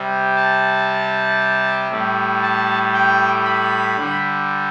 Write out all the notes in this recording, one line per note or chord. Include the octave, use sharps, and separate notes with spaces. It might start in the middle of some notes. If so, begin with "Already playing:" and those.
Already playing: C3 G3
A5
A2 G3
A5
G5
B5
D3 G3